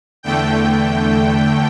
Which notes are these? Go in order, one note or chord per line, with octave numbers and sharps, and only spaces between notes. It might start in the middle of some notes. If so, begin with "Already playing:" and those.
E2 D3 A3 G5